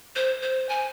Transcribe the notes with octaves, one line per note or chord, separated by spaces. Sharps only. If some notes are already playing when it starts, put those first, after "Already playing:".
C5
C5
G#5